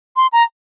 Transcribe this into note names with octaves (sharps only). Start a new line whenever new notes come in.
C6
A#5